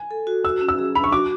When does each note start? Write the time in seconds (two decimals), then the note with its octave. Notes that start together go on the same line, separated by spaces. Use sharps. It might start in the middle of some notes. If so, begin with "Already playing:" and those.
Already playing: G#5
0.11 A4
0.27 F#4
0.45 F#4 E6
0.61 C#4
0.69 E6
0.79 G#4
0.95 D4 B5
1.04 C#6
1.12 F#4 D6